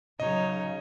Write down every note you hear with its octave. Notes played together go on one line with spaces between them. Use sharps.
C#3 F#3 D#4 C#5 D#5